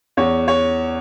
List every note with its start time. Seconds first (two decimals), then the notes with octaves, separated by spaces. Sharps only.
0.17 E2 C#5
0.48 C#5